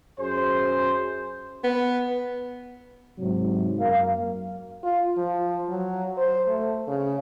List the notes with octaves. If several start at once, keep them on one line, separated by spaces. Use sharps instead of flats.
F#2 G#4 C5
B3
G#2 C3 F#3
F#2 A#3 F5
F4
F3
F#3
C5
A3
C#3